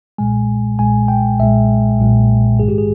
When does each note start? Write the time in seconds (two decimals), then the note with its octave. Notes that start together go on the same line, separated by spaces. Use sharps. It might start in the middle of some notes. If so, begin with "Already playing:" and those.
0.18 B1 A#2 G#3 G#5
0.79 B1 A#2 G#3 G#5
1.08 G5
1.40 B1 A#2 G#3 E5
1.99 B1 A#2 G#3
2.59 A#1 G#2 D#3 G#3 G#4
2.68 G4
2.78 G#4